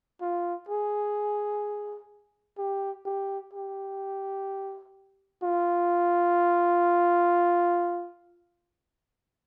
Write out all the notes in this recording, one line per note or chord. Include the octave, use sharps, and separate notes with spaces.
F4
G#4
G4
G4
G4
F4